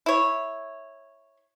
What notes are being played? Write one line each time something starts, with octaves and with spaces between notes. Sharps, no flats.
E4 C#5